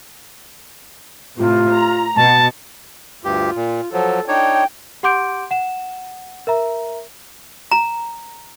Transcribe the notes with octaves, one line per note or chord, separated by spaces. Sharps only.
A2 C3 F4
A#5
B2 A5
D2 G2 F4 G4
A#2
F3 F#3 A4
D4 D#4 C#5 G5
G4 F#5 C6 D6 G6 D7
F#5 E7
A#4 E5 A#5
A#5